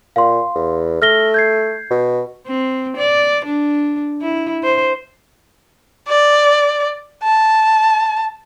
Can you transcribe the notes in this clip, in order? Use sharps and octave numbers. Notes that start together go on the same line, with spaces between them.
A#2 F5 C6
E2
A3 F6 A#6 G7
G6 G#6 C7
B2
C4
D5
D4
E4
C5
D5
A5